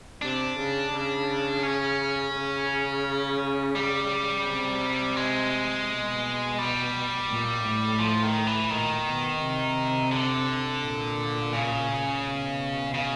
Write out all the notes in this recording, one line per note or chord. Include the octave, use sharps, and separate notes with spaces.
C3 D4
C#3
C#3
C#4
C#3
G3
C3
G#3
B2
G3
A#2
A2
F3
D#3
E3
A#2 D#3
B2
C3
D3
A#2
C#3
B2
C#3